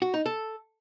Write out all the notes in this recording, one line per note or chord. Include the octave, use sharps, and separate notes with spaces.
F#4
D#4
A4